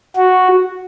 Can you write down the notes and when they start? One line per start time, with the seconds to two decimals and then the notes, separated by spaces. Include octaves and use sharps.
0.16 F#4